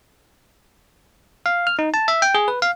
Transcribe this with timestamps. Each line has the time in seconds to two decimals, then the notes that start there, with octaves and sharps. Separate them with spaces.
1.46 F5
1.67 F6
1.79 D#4
1.94 A5
2.08 E5
2.22 G5
2.35 G#4
2.48 B4
2.62 F5